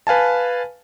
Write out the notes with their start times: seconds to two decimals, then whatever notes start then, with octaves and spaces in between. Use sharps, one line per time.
0.07 B4 F5 G#5 A5